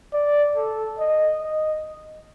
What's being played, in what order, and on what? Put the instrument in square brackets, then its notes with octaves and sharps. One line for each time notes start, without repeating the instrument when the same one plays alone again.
[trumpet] D5
A4
D#5
D#5